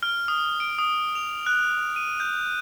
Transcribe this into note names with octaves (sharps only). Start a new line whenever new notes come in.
F6
D#6
D7
D#6
F7
F#6
D#7
G6